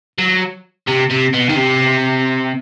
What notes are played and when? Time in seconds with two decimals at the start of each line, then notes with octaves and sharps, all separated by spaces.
0.18 F#3
0.87 C3
1.10 C3
1.33 B2
1.49 D#3
1.56 C3